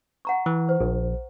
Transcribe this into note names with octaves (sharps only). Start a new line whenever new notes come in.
F#5 A#5 C#6
E3
C5
A#1